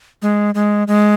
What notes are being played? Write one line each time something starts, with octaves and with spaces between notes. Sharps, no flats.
G#3
G#3
G#3